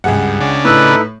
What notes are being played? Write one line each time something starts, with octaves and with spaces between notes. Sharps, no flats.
C#2 G2 G#4 F#5
C#3 D4
A2 D#4 E4 A4 B4